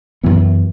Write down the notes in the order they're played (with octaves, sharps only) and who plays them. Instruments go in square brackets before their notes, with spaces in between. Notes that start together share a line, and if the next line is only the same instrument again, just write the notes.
[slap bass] F#2 E3 B3